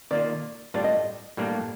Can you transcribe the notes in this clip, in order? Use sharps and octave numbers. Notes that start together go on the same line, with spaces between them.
D#3 A#3 F4 D5
A2 G3 D4 F4 D5
D#5
A2 G3 A#3 D4